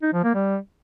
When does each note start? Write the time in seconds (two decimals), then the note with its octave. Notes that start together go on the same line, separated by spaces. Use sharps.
0.02 D#4
0.13 F3
0.24 A#3
0.34 G3